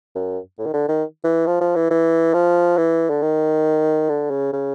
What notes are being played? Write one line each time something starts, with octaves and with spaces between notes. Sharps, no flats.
F#2
A2
D#3
D3
D#3
E3
F3
F3
E3
E3
F3
E3
D3
D#3
D3
C#3
C#3